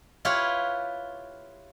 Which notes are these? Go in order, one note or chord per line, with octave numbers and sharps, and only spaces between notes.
E4 F4 G4 B4 C#5